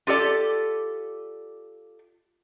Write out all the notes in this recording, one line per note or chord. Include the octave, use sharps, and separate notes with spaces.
F4 G4 A4 D5